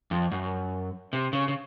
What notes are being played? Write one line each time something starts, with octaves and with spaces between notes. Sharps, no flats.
F2
F#2
C3
C#3
C#3